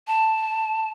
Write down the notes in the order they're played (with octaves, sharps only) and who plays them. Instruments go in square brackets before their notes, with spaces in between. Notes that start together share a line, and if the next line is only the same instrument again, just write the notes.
[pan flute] A5